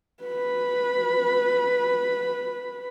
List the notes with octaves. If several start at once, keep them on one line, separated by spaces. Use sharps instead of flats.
B4 B5